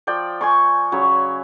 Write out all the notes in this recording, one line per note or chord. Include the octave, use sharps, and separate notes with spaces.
F3 D5 G5
G#5 C6 C#6
C#3 F#3 C#5 B5